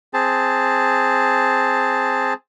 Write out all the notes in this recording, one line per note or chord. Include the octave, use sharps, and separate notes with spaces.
C4 G#4 A5